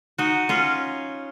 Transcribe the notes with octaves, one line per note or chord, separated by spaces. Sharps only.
D#4 F#4
C#4 F4